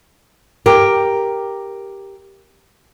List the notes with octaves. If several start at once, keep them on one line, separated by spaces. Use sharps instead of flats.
G4 A#4